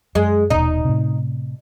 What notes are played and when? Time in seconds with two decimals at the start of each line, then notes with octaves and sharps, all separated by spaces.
0.15 F#2 G#3
0.50 D#1 G#1 B2 D#4
0.85 A2 C3